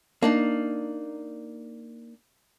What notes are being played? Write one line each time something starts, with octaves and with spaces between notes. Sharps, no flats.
A#3 D4 D#4